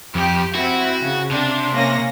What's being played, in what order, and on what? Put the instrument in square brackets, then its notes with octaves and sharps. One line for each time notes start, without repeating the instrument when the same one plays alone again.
[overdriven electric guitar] F2 [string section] G4
[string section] C4 E4 [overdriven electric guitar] F#4
[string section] C#3
[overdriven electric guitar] C3 [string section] D4
[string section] A#3 C#4 A#6